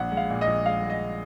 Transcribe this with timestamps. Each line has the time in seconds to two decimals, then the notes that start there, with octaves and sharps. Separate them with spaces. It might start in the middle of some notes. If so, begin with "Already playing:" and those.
Already playing: A#1 F#5
0.11 G#3
0.17 F5
0.30 A#2
0.41 D#5
0.47 A#1
0.66 G#3 F5
0.83 G#3
0.90 D#5